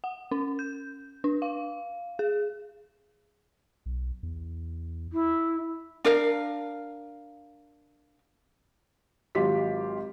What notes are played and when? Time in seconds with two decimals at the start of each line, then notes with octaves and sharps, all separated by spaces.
0.04 F#5
0.31 C#4
0.59 G6
1.24 D4
1.42 F5
2.19 G#4
3.86 B1
4.23 E2
5.12 E4
6.05 D4 A#4 F5
9.35 G#1 F#3 F4 G4 B6